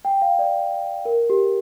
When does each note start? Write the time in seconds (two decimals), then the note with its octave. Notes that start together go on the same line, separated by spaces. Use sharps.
0.05 G5
0.22 F5
0.39 D5
1.05 A#4
1.30 G4